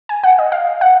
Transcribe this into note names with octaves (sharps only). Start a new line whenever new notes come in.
G#5
F#5
D#5
F5
F#5